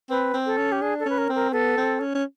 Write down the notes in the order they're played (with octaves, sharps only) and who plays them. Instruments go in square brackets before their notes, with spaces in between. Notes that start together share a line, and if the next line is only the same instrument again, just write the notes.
[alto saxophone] C4 [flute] B4
[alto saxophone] C4
[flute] A4
[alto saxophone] C#4
[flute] G4
[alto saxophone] D4 [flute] G#4
[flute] A4
[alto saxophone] C#4 [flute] B4
[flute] A#4
[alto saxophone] C4
[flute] A#4
[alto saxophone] B3 [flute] A4
[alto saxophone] C4
C#4
C#4